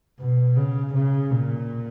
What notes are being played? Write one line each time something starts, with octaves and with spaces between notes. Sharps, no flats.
B2
C#3
C#3
A#2